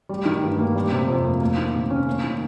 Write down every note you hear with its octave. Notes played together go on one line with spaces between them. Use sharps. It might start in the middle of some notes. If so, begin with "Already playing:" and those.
G3
D#3
G2
A#3
G3
C3
F2
A#3
A#3
D#3
C3
C#4
A#3
D#3